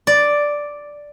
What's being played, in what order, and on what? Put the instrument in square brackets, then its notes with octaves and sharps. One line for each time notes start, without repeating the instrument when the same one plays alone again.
[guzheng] D5